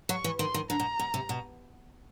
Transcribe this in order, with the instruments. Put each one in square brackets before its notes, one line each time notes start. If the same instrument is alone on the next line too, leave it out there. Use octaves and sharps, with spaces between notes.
[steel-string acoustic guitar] F#3 [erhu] C#6
[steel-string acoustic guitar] E3
[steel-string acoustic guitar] D#3 [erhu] C6
[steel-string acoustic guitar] D#3
[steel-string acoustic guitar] D3 [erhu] A#5
[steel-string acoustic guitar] B2
B2
C3
B2